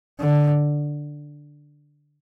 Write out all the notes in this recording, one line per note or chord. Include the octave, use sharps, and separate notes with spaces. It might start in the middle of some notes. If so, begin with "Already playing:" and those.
D3